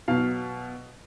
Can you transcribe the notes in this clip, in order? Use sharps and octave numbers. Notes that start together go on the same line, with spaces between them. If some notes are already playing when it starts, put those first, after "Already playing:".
B2 F#3 F5